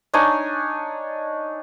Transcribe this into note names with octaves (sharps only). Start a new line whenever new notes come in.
D4 D#4 C#5 G#5